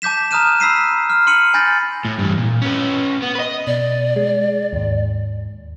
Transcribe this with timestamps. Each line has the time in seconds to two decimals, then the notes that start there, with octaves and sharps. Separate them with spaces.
0.02 A5 D6 G6 B6 E7
0.31 A#5 D#6 F6 F#6 D#7 E7
0.60 B5 E6 B6 C7 D#7
1.10 F6
1.27 C6 F6 C#7 D#7 F#7
1.54 G#5 B5 G6 A6 A#6
2.05 A2
2.19 G2 E3
2.38 A#2
2.62 C#4 B4
3.22 B3
3.35 B4 D#5
3.67 B2 D5
4.16 G#3
4.73 D#2 G#2